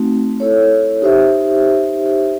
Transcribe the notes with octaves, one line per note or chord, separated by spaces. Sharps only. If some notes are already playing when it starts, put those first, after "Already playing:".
Already playing: A3 C4 D#4 F#4
E4 A4 C#5
D#4 G4 C5 E5